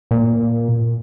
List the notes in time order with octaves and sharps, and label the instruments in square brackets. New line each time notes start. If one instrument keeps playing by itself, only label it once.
[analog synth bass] A#2